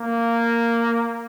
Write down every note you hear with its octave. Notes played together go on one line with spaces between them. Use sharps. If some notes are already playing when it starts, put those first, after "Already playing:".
Already playing: A#3